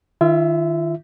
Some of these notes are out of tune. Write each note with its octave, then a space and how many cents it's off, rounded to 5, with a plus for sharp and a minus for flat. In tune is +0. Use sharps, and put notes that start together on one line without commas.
D#3 +0 F4 -35 E5 +0